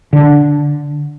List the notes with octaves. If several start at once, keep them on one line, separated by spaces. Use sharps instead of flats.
D3